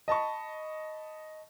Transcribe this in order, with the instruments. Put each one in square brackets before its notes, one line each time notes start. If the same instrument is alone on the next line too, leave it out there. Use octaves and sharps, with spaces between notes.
[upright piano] D#5 A5 B5 C#6